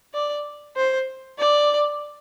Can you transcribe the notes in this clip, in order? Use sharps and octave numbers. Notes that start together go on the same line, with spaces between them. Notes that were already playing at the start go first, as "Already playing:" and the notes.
D5
C5
D5